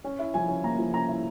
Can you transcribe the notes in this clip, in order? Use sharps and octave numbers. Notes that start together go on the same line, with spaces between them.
C#4
E4
F3 G#5
C#4
A#3 A#5
F3
C#4 A#5
E4